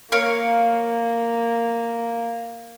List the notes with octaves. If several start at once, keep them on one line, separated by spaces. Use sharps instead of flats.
A#3 A#4 C#5 F5